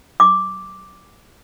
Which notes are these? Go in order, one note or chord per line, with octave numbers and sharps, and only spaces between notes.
D6